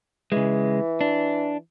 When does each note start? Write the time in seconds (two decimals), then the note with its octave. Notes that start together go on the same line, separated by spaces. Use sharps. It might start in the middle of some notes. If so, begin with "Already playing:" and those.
0.32 C#3 E3 G#3
1.01 D4